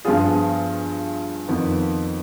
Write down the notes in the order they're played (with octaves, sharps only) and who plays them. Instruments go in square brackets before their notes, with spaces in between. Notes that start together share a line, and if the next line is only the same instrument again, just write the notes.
[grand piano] G2 F3 B3 F4 G#4
F2 D#3 B3